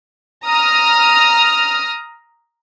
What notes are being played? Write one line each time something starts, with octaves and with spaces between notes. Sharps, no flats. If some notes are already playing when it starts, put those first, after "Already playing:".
A#5 D#6 F6